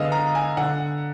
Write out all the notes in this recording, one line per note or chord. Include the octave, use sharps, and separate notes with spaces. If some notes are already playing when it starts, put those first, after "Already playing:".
Already playing: D3 G#3 B3 D#5 F5
A#5
G#5
D3 F#5